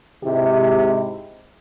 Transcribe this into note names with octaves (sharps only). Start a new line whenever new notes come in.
G#2 C3 G#3 D#4 E4 G4